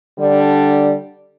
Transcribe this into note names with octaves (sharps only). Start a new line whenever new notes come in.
D3 G3 D4